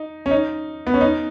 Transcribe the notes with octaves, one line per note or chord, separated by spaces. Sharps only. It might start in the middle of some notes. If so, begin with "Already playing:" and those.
Already playing: D#4
C#4
D#4
B3
C#4
D#4